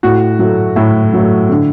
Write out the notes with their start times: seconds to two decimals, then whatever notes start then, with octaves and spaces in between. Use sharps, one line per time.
0.03 A2 F#4
0.39 F#3 A3
0.76 A2 E4
1.13 F#3 A3
1.49 D3